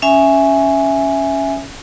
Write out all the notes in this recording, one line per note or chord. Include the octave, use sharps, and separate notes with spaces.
C#4 E5 G#5